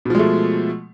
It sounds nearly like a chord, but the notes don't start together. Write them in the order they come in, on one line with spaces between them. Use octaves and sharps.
B2 F3 G#3 A3